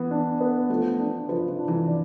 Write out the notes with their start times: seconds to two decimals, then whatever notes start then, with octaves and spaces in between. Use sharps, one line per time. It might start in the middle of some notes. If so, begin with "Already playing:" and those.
Already playing: E3 B3
0.11 D4
0.41 B3
0.69 F3 A3
0.99 D4
1.28 F3 B4
1.48 F3
1.58 D4
1.68 E3
1.88 D5